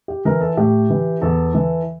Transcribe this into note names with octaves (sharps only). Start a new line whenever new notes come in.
G4
E3 A#4
A4
A2 G4
E3
E2 A4
E3